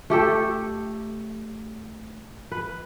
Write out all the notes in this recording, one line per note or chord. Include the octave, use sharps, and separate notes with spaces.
A3 G4 A4
B4